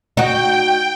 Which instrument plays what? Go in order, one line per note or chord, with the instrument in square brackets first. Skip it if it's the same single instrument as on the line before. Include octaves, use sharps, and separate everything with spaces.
[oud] D#4 F#4 [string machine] G5